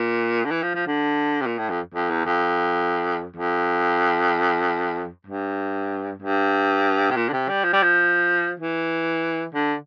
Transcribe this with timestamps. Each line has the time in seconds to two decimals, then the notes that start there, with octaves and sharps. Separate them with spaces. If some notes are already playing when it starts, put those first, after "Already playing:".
Already playing: A#2
0.45 D3
0.51 E3
0.63 F3
0.75 F3
0.87 D3
1.41 C3
1.46 A#2
1.58 A2
1.70 F2
1.94 F2
2.10 E2
2.25 F2
3.36 F2
5.27 G2
6.22 G2
7.10 C3
7.16 A#2
7.29 D3
7.33 C3
7.49 G3
7.64 F3
7.73 G3
7.83 F3
8.60 E3
9.54 D3